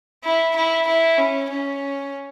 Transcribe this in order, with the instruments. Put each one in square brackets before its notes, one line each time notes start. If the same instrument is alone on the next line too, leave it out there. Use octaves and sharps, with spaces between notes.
[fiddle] E4
E4
E4
C#4
C#4